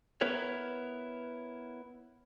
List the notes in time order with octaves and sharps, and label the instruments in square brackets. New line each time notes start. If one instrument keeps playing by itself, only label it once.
[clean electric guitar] B3 E4 A#4 B4 C#5